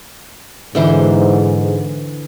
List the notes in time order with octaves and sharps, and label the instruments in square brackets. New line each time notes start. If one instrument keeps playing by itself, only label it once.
[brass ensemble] G#2 [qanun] D3 E3 C5